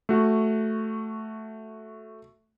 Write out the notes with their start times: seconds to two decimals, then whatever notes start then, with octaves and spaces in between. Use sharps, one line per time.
0.09 A3 F#4